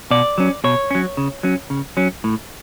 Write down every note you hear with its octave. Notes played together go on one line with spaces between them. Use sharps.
B2 D5
F#3 C#4
B2 C#5
F#3 C#4
C#3
F#3 C#4
C#3
F#3 C#4
A2